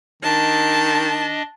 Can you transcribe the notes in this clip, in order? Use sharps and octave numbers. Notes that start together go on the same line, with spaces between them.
D#3 D4 D#5 A5